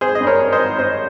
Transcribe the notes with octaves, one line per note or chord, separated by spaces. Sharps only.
G#1 G#4 C5
D#5
G2
A#4 C#5
G#1
C5 D#5
G#1
G2 C5 D#5